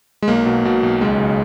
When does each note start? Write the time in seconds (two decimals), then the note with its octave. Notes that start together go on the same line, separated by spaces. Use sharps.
0.22 G#3
0.28 B1 A#3
0.46 B2
0.65 B2
0.83 B1
1.01 C#2 G#3
1.20 C#3